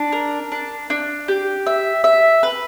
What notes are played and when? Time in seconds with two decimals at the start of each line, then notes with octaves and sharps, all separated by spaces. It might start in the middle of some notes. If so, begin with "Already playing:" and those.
Already playing: D4
0.12 A#4
0.52 D4
0.90 D4
1.28 G4
1.67 E5
2.04 E5
2.43 B4